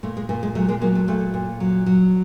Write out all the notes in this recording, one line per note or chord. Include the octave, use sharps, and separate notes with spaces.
A#2 A3
G#3
A#2 A3
G#3
F#3 A3
G#3 A#3
F#3 G#3 A#3
A3
A#2 A3
A#2
F#3
F#3